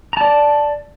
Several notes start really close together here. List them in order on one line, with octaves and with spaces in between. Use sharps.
A#5 A5 D5